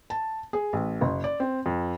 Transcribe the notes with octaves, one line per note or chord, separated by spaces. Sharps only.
A5
G#4
A1
F#1
D5
C4
F2